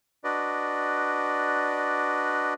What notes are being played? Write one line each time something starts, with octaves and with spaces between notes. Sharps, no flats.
D4 F#4 B4 D5 D#5